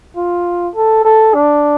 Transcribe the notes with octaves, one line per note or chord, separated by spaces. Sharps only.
F4
A4
A4
D4